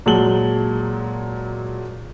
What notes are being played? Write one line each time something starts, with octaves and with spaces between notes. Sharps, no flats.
A#2 F#3 G#3 A5 F#7 G7